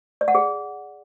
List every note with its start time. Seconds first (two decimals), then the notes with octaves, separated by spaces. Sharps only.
0.21 D5
0.28 F#5
0.35 G#4